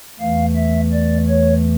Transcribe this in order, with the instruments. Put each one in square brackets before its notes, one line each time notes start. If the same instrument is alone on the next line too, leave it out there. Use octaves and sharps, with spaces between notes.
[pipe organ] E2 E3 A3 F5
E5
D5
C#5